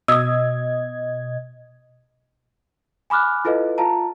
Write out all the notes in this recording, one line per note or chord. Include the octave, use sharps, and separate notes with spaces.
B2 D#5 D#6 E6 G#6
G#5 B5 D6 F6 F#6
E4 F4 A4 B4 D#5 F5
F4 F5 A5 A#5